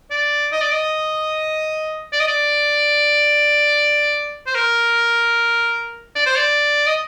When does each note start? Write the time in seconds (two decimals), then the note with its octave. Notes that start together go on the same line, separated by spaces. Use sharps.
0.11 D5
0.52 D#5
0.61 D5
0.72 D#5
2.13 D5
2.20 D#5
2.28 D5
4.46 C5
4.55 A#4
6.15 D5
6.26 C5
6.36 D5
6.87 D#5